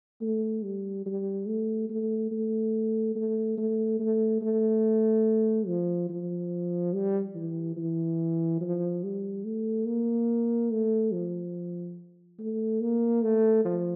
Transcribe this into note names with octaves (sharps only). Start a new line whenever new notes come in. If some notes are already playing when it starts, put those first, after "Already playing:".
A3
G3
G3
A3
A3
A3
A3
A3
A3
A3
F3
F3
G3
E3
E3
F3
G3
A3
A#3
A3
F3
A3
A#3
A3
F3